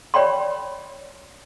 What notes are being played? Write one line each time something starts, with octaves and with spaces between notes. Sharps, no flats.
C#5 D5 G5 B5 C6